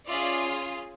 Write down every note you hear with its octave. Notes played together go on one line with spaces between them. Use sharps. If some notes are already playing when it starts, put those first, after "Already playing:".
C#4 F4 G#4 D5 E5